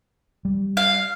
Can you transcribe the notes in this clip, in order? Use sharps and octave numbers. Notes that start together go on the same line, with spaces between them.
G3
F5